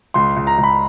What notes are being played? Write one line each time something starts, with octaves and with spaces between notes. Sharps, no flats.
C#2 C6
C#2
A#5
C#2
B5